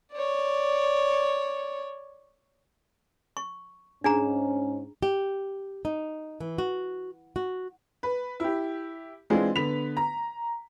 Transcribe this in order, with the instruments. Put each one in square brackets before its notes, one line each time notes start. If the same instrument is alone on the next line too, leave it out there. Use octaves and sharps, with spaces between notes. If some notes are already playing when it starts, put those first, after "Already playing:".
[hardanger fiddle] C#5 D5
[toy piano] C#6
[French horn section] G#2 C#4 [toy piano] D4 G#4 A#5
[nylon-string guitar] G4
D#4
E3
F#4
F#4
[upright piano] B4
E4 G4
E3 G#3 C4 D4 F4 G#4
D3 B3 B4 B6 F7
A#5